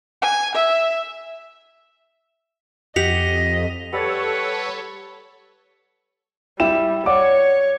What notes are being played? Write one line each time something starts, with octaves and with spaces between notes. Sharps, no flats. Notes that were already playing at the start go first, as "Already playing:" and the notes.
G#5
E5
F2 G4 D#5 F#5 B6 F7
G3 A4 B4 C#5 F#5
G3 E4 G5 E7
C#5 D5 F#5 D6